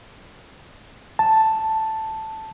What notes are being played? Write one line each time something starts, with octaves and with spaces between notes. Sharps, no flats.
A5